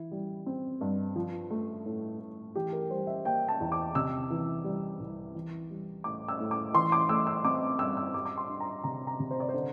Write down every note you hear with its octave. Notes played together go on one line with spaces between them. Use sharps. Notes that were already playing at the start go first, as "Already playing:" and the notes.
Already playing: E3 E4
G3
C4
G2
F3
A3
A2
A2
E3 G4
A#4
G3 C5
E5
A#3 G5
A5
E2
D6
C3 E6
E3
G3
C2
E3
G3
A2 D6
E6
A2
D6
E3 C6
D6
A3 E6
E6
C4 D6
G2 E6
E6
G3 D6
D6
C6
D4
A#5
C3 A#5
A#5
C3
C5
D5
D3 C5